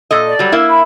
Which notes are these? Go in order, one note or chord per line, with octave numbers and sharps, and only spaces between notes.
A#2 A4 D#5
D5
F#3 G3
A#3 E4
B5